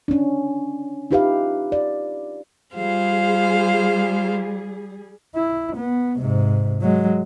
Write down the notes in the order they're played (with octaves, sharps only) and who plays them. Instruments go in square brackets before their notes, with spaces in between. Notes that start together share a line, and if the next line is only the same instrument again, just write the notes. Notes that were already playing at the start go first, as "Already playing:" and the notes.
[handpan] C#4 D4
D#4 F4 G4 B4 E5 F5
D5
[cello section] G3 G#4 [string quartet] F4 C5 F5
[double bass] E4
B3
G#2 C3
F#3 G#3